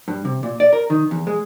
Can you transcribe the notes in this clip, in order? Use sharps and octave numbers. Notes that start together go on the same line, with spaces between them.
G2
C3
A#2
D5
A#4
D#3
E2
G#3